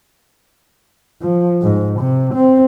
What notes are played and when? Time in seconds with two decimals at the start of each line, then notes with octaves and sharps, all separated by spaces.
1.22 F3
1.62 G#2
2.00 C3
2.35 C4